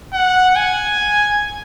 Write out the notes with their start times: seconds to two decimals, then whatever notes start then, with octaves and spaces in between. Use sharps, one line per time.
0.13 F#5
0.56 G#5